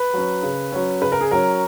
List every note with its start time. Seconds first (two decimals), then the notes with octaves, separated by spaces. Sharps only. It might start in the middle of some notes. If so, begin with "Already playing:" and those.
Already playing: B4
0.14 F#3 C#4
0.43 C#3
0.72 F#3 C#4
1.01 C#3 B4
1.12 A#4
1.21 G#4
1.31 F#3 C#4 A#4